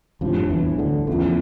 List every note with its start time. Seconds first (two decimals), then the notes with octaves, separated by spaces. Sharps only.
0.21 F2 A2 F3 G3 D4
0.50 E2 E3
0.79 D2 D3
1.07 E2 C#3 E3 F3 A3